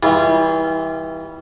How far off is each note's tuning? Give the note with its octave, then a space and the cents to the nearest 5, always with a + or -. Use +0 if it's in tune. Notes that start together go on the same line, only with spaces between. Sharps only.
E3 -30 G3 +0 F4 -25